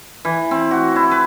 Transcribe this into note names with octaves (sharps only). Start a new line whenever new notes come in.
E3
C4
F#4
E4
B4